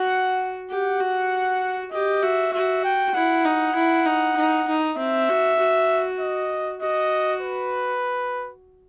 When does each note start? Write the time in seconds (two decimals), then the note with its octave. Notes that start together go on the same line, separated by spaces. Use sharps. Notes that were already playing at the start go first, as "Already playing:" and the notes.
Already playing: F#4 F#5
0.70 G4 F#5
1.00 F#4
1.92 G4 D#5
2.23 F#4 E5
2.53 F#4 E5
2.84 G5
3.14 E4 F#5
3.45 D#4
3.75 E4
4.06 D#4
4.37 D#4
4.68 D#4
4.97 C4 E5
5.29 F#4
5.59 F#4
6.20 D#5
6.81 F#4 D#5
7.42 B4